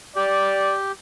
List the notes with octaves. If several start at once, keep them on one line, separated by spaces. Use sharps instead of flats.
G4 D5